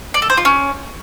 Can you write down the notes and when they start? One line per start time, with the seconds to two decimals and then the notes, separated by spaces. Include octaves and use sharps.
0.14 D5
0.22 A4
0.30 C5
0.37 F4
0.45 C#4